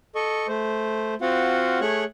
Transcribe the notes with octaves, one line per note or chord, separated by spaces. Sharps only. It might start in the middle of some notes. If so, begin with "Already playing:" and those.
A4 D#5 C#6
A3 C5
C4 F4 F#4 F5 F#5
A3 G#4 C#5 C#6 F#6